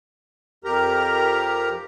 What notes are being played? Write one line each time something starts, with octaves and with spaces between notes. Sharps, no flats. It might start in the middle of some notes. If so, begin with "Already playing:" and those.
F2 G4 A#4 A#5